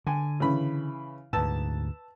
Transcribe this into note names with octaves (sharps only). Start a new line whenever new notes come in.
D3 G#5
C#3 E3 B5
D2 G#2 B4 A5 E6